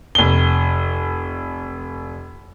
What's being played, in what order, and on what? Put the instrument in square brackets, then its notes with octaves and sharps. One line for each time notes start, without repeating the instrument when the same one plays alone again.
[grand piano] F1 G7